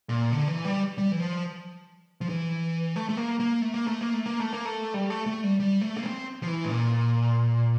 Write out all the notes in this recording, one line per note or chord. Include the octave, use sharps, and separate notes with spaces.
A#2
D3
E3
G3
G3
E3
F3
F3
E3
A3
A3
A#3
A#3
A3
A#3
A3
A#3
A3
A#3
A3
A#3
A3
G3
A3
A3
G3
G3
A3
A#3
C4
F3
E3
A2
A#2